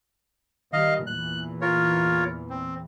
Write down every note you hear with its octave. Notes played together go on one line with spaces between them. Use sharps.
D#3 G3 D#5 F5
E2 A#2 E3 F#6
F4 A#4 C#5
C4